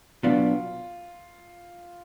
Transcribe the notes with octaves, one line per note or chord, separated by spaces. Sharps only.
B2 F#3 B3 D4 F4